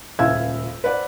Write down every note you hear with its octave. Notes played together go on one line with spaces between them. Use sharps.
D#1 C#2 E5 F5 E6 G#6
B4 C5 D5 F#5